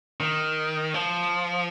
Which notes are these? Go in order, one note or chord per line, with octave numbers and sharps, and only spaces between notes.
D#3
F3